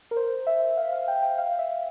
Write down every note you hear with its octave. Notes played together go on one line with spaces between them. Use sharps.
A#4
C5
E5
F5
F5
G5
G5
F5
E5